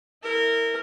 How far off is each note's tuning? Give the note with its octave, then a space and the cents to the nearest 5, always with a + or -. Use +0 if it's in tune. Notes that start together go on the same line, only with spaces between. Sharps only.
E4 -15 A#4 -20